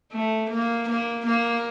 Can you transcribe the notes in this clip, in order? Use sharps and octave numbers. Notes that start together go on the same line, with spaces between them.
A3
A#3
A#3
A#3